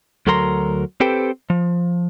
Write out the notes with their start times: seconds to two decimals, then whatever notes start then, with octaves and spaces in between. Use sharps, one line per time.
0.27 D2 F#3 A4 A#4 A#5 C6
1.00 C4 G4 A4 B4 C5 G5
1.50 F3